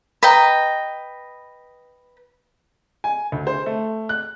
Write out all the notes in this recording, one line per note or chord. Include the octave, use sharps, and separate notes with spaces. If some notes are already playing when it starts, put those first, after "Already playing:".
B4 D#5 G5 A#5
G#5
D2
C5
A3
F#6